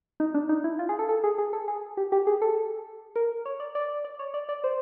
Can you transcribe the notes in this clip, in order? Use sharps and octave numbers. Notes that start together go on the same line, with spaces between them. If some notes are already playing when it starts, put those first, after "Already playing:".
D#4
D4
D#4
E4
F4
G#4
A4
A4
G#4
G#4
A4
G#4
G4
G4
G#4
A4
A#4
C#5
D5
D5
D5
C#5
D5
D5
C5